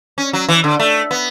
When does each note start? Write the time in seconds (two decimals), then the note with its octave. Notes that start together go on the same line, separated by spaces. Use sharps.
0.18 C#4
0.33 F#3
0.49 E3
0.64 D3
0.80 A3
1.11 B3